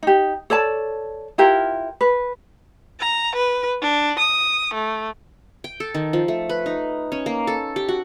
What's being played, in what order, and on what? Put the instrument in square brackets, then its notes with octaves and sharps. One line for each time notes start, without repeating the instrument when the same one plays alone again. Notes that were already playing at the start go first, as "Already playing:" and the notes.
[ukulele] D#4 G4
A4 C#5 D5 A5
E4 F4 G4 A#4
B4
[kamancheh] A#5
B4
D4
D#6
A3
[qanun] G5
A4
D#3
F3
A3
B4
D#4
C#4
A#3
A4
G4
F#4